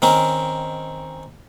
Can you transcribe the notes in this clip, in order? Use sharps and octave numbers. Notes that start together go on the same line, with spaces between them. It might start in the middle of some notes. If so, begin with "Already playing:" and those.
D#3 C4 C#4 A#4